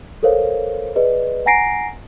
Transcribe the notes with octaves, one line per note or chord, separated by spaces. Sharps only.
A4 A#4 C5 C#5 F5
G#4 B4 D5 D#5
F#5 G#5 A#5 A#6 C7 D7